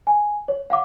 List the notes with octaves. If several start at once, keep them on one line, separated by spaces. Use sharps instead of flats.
G#5
C#5
F5 F#5 D6